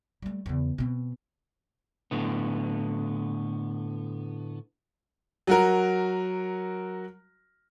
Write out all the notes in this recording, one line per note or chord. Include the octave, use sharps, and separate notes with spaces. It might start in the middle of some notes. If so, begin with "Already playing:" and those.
G3 A3
E2 C#3
B2 C4
A2 D3 B3
F#3 F#4 A#4